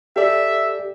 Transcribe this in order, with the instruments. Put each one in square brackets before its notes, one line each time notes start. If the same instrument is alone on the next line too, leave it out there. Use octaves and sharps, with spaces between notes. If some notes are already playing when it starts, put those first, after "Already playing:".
[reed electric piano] G4 A4 D5 [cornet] E5